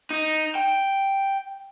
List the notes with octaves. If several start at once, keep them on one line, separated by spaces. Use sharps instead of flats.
D#4
G5